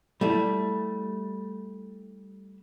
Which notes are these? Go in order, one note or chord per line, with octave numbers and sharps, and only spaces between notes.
G3 A3 E4